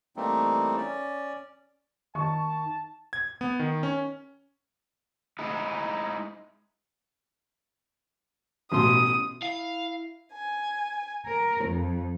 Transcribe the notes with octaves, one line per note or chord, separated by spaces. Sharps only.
E3 G3 A3 A#3 C4 D#4
C#4 D5
D#3 A5 C#6
G#6
B3
D#3
C#4
G#3 D#4 E4
A1 B2 C6 D#6
E4 F5
G#5
A#4
F2